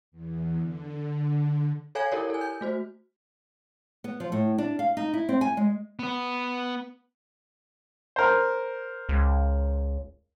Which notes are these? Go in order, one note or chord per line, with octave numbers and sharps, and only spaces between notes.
E2
D3
A4 C#5 F5 G#5 G#6
E4 G4 A4 A#4 C#5 D5
A4 G#5
G6
A3 F#4 C5
B3
F3
A2
D4
F5
D#4
E4
C4
G#5
G#3
B3 B4
A#4 C5
C#2